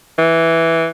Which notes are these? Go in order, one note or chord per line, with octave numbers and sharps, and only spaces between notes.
E3